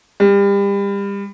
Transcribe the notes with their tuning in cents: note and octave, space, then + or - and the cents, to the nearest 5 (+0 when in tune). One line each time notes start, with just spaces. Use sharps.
G3 +30